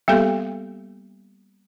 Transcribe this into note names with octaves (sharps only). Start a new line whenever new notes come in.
G3 A#3 B3 G4 A4 F5